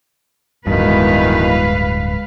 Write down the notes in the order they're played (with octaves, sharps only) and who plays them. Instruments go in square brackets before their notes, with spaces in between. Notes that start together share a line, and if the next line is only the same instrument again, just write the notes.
[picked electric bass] D1 G2 [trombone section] B2 D#3 E3 [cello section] G#3 B4 F5